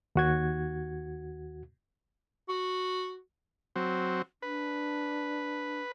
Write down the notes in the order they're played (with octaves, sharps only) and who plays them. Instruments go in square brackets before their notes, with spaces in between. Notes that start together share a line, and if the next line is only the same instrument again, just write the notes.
[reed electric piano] D#2 F#4 G#6
[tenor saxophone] F#4
[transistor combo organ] F#3 C4
[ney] D4 [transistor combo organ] B4